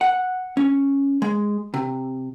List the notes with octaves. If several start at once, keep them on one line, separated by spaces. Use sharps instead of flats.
F#5
C#4
G#3
C3